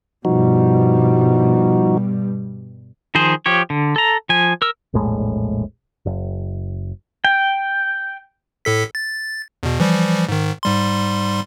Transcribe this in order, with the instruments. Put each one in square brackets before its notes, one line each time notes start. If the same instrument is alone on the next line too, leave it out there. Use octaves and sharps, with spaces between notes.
[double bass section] G2 B2 G3 [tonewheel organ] F3 D#4 F#4
[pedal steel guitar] D#3 F3 G#4 C5
F3 G4 C#5
D3
A4 A#5
F3 G#5
A#4 E6
[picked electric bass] E1 A#1 A2 G#3
F#1
[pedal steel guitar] G5
[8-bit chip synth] A2 A4 B6
A6
E2 B2
E3 F3 G3
G#2 D#3
G#2 G3 C6